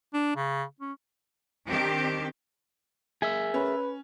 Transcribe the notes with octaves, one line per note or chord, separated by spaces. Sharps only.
D4
C#3
C#4
D#3 C4 D4 G4
G#4 A#4 E5 G#5 E6
C#4 B4